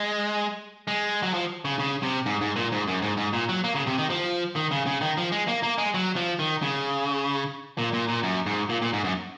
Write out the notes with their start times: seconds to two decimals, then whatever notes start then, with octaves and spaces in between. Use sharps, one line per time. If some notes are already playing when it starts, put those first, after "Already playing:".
Already playing: G#3
0.87 G#3
1.23 F#3
1.34 F3
1.65 C#3
1.79 C#3
2.03 C3
2.26 G#2
2.41 G#2
2.56 A#2
2.72 G#2
2.87 F#2
3.02 G#2
3.17 G#2
3.33 A#2
3.49 F#3
3.64 A#3
3.75 C#3
3.87 C3
3.98 D#3
4.10 F3
4.56 D#3
4.71 C#3
4.86 C#3
5.01 D#3
5.17 F3
5.32 G#3
5.48 A#3
5.63 A#3
5.78 G#3
5.94 F#3
6.16 F3
6.39 D#3
6.62 C#3
7.78 A#2
7.93 A#2
8.08 A#2
8.23 F#2
8.46 G#2
8.69 A#2
8.82 A#2
8.93 G#2
9.04 F#2